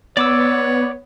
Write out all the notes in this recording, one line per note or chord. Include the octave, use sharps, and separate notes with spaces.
B3 C#5 D5 D6 E6